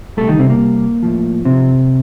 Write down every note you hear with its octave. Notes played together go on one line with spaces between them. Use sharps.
C2 C3 G3 A3 A4
D#3 D#4
C3 C4
A#3
A2 F3
C3 C4